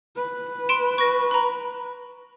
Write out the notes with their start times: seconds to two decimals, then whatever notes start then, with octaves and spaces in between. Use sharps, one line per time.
0.16 B4
0.69 C6 D7 E7
0.98 C#6 A#6
1.31 A#5 B5